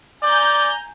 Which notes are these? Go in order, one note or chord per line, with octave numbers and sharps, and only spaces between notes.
D5 G#5 A#5 G6